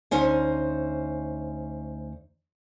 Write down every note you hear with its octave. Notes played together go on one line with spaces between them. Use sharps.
D2 C#4 D#4 C5 G#5